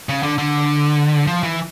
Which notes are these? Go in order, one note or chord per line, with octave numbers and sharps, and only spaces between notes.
C#3
D3
D3
F3
E3